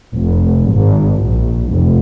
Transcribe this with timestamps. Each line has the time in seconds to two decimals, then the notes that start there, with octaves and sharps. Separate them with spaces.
0.15 F1
0.74 G#1
1.24 A#1
1.68 F1